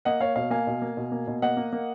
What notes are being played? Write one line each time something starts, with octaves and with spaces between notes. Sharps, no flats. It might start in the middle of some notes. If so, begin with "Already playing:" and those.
A#3 D#5 F#5
A#3 C#5 F5
B2 C#5 F5
A#3 F5 G#5
B2
A#3
B2
A#3
B2
A#3 D#5 F#5
A#3
A#3